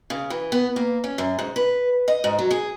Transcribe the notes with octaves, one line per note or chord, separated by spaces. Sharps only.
C#3
E3
B3
A#3
C#4
F#2
G#2
B4
D#5
G#2
F#3
G#4